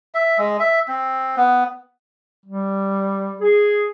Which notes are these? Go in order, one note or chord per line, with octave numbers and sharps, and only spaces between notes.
E5
G#3
E5
C4
B3
G3
G#4